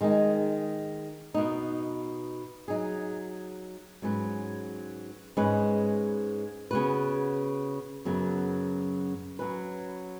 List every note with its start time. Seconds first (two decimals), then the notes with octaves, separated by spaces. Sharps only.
0.01 D#3 G#3 D#4
1.34 B2 B3 D#4
2.68 F#3 D#4 G#4
4.02 G#2 F#3 C#4 B4
5.37 G#2 G#3 C#4 B4
6.71 C#3 B3 F#4 B4
8.05 F#2 C#3 F#3 B3
9.39 F#3 C#4 B4